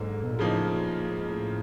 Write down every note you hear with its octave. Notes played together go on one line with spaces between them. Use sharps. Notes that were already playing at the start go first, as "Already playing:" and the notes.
Already playing: G#2 D3 F#3 A#3
B2
A#2
A2 C#3 F3 A#3 D#4
A#2
A2
G#2
A2